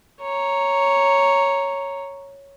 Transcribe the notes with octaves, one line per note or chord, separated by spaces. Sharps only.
C#5 A#5